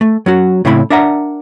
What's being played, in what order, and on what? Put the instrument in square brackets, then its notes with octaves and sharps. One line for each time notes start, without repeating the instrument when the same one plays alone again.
[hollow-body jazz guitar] A3
F#3 C#4 F#4
A2 C#3 C4 E4 B5
D4 A#4 E5 F#5 A#5